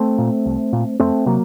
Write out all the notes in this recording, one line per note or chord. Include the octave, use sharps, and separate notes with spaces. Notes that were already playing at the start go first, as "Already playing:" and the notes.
Already playing: A3 C4
A#2
C2
A#2
F2 A3 C4
C3 F#3 A#3